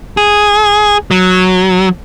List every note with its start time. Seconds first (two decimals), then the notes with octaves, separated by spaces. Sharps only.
0.17 G#4
1.11 F#3